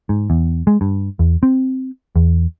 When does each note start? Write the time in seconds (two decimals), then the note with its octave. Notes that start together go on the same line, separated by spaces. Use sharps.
0.09 G#2
0.30 E2
0.67 G#3
0.81 G2
1.19 E2
1.43 C4
2.16 E2